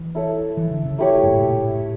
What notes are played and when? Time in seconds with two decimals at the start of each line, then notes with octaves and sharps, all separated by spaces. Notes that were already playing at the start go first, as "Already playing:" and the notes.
Already playing: E3
0.15 E4 A4 C#5
0.57 E3
0.71 D3
0.85 C#3
0.99 A3 E4 G4 C#5
1.23 G2
1.32 A2
1.41 A#2
1.62 A2